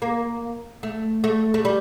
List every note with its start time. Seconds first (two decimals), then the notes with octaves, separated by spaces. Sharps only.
0.02 A#3
0.83 A3
1.24 A3
1.54 A3
1.65 G3